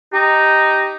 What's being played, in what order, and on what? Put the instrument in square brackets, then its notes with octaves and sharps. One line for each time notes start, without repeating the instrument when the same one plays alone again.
[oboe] D#4 [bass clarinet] G4